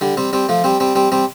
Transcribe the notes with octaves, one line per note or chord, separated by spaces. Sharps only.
D3 G3
G3 C4
G3 C4
F3 A3
G3 C4
G3 C4
G3 C4
G3 C4